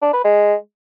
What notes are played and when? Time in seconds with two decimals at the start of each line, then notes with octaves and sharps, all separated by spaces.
0.02 D4
0.13 B4
0.24 G#3